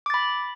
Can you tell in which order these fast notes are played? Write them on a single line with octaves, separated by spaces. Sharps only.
D6 A6 B5